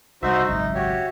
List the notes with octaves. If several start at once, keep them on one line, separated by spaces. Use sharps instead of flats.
C2 G3 D#4 F#4 C5 E5
G#1 C#2 F#2 D#4
F#4 G4 C#5